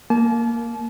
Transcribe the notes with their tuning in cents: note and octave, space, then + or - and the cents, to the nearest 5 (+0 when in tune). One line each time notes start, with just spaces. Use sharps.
A#3 +0 A5 -40